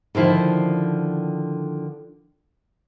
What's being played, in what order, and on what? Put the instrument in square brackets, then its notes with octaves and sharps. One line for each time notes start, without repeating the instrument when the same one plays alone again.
[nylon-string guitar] D3 D#3 F3 E4